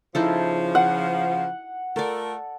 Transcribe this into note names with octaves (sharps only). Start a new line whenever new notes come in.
C#3 F3 D#4 E4 A4
F#5
A3 F4 A4 A#4 D5